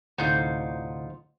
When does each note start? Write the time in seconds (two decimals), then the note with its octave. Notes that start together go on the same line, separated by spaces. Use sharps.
0.18 D2 A2 C3 D#4 F4 F#5 G6